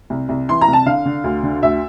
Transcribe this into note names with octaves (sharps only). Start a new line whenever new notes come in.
C2
C2
E3 C6
A#5
C2
A5
D3 F5
D3
D2
D3
D2 E5